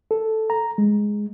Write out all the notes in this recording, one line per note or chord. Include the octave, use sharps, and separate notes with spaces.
A4
A#5
G#3